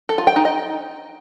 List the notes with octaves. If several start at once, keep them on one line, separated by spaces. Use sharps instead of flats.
A4
F4
G5
D#4
D#5